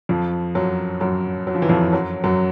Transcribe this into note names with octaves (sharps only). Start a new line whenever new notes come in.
F2 F3
F#2 F#3
F#2 F#3
F#3
F3
E3
F2 F3
F#2 F#3
F#2 F#3